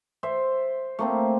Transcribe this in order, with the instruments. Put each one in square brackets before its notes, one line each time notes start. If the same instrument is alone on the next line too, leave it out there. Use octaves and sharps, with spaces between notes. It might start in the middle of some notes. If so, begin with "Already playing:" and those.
[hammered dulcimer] C5 E5
A3 A#3 C4